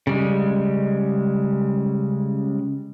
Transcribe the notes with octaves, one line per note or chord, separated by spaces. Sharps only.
C#3 G3 G#3